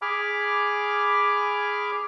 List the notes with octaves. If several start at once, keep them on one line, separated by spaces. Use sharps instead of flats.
G#4 G#5 B5 D6 F6